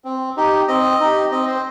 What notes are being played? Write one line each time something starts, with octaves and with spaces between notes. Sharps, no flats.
C4
D#4 G4
C4 D#5
D#4 G4
C4 D#5
C5